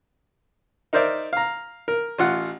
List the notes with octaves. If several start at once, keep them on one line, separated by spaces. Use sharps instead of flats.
D#4 A#4 C5 D5 E5
F5 A#5
A#4
A1 F4 F#5